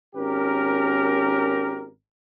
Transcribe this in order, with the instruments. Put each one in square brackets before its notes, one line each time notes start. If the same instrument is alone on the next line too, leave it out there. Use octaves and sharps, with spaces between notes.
[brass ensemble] G#1 C#4 G4 A#4